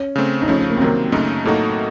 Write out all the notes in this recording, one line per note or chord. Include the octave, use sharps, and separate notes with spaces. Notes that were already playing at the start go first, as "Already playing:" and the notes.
Already playing: C#4
C#3 A3 C4
D#4
C#3 F3 A3 C#4
C#4
A#3
C4
C3 D#3 F#3 A#3
F#2 C#3 A3 D#4
A2 F#3 A3 A#3 D#4 F#4